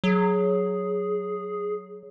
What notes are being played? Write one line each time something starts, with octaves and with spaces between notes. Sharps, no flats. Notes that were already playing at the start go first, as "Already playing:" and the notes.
F#3 G#4